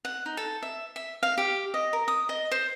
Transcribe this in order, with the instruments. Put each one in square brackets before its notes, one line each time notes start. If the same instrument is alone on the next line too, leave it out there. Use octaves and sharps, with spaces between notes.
[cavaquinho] F#5
D#4
A4
E5
E5
F5
G4
D#5
A#4
D#6
D#5
C5